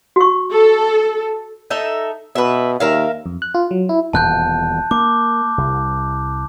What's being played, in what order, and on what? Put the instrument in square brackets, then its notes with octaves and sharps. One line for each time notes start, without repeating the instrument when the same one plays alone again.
[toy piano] F#4 C#6
[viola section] A4
[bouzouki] D#4 A4 E5
[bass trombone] B2 [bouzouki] B4 E5
[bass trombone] D#2 [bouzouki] A#4 E5 F5
[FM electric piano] F2
F#6
F4
F#3
E4
[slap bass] D#1 E2 B2 [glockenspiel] A5 F#6 G6
[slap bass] A#3 [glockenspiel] D6
[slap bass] C2